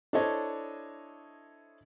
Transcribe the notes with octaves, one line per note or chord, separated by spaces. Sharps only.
D4 E4 A4 C5 C#5 D#5